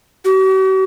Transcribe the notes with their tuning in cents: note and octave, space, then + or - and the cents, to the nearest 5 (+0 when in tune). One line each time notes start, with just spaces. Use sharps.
F#4 +45